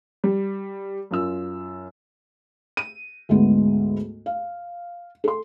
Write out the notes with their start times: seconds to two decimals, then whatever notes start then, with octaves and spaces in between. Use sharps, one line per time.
0.24 G3
1.11 F#2 F4 E6
2.77 D#7
3.29 D2 G#2 G#3 B3
4.26 F5
5.24 A4 C6